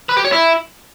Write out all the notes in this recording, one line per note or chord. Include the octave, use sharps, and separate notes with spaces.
B4
G4
C#5
E4